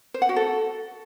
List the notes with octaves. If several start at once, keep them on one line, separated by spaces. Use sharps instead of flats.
C5
F#5
F#4
A4